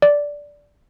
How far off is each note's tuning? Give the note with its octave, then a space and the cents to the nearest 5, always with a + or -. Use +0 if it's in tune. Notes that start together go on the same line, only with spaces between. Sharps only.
D5 -10